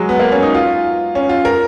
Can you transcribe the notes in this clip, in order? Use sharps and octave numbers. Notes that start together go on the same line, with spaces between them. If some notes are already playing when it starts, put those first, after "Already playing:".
Already playing: F#3 G#3
B3
A#3
C#4
D#4
F4
C#4
F4
A#4